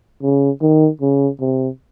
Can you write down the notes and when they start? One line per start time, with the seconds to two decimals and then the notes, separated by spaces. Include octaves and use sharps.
0.23 C#3
0.62 D#3
1.01 C#3
1.40 C3